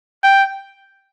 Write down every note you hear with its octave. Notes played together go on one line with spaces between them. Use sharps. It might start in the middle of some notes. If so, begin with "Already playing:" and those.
G5